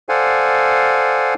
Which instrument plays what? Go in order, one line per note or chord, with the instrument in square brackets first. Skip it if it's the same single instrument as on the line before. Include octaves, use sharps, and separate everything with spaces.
[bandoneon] A4 C5 D5 F5 F#5 G#5